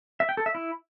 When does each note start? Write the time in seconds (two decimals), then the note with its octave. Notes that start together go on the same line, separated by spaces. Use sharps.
0.20 E5
0.29 G5
0.37 A4
0.46 E5
0.55 E4